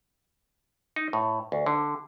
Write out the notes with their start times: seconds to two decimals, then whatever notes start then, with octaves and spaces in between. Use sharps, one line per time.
0.96 D#4
1.13 A2
1.52 D2
1.66 D3